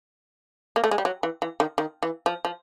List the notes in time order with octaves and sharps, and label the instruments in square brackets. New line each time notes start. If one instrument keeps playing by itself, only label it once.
[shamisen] A#3
A3
G#3
G3
F#3
E3
E3
D#3
D#3
E3
F3
F3